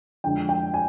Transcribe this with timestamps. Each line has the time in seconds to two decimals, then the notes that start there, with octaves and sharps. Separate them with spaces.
0.24 F2 D3 G#3 D4 G5
0.49 G5
0.74 G#5